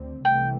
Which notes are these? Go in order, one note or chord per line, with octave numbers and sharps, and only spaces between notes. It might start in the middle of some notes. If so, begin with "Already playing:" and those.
Already playing: D2 D3 C4
C2 C3 E3 A3 G5